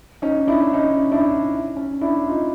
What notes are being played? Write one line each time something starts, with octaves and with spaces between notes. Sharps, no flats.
C#4 D#4
D4 E4
C#4 D#4
D4 E4
C#4
D4 E4
D#4 F4